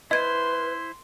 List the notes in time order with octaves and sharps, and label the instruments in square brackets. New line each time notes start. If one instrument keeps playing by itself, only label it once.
[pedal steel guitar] E4 C5 [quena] B4 [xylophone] D#5 G#6 [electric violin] C6